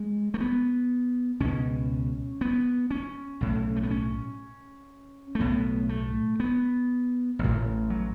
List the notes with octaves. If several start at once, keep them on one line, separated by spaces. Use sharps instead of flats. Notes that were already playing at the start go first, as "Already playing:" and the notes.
Already playing: G#3
A3
B3
C#2 B2 C#4
B3
C#4
B1 A2
A3
B3
C#4
A3
B1 A2 B3
A3
B3
A1 A2
F#3